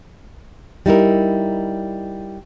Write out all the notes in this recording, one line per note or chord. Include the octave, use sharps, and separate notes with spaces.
G3 D#4 E4 A#4